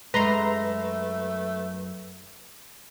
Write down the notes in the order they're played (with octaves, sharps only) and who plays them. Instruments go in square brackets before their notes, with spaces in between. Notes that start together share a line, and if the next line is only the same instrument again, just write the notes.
[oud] F#2 G#3 [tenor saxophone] A3 [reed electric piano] B4 [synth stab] A#5 C6